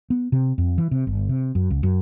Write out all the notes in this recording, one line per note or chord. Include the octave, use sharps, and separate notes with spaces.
B3
C3
F2
E3
C3
G1
C3
F#2
C#2
F#2